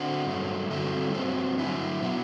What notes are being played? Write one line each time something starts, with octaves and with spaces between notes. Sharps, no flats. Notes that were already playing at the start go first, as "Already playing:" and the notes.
Already playing: D3 C4 F#4
G2 F#3 A3
D3 G3 C4 F#4 A4
G2 F#3 C4
D3 F#3 A3 E4
B2 F#3 B3 F#4